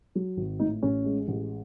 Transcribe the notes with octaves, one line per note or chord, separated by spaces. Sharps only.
F#3
G#1
A2 D#4
A1 C#4
G#3
A1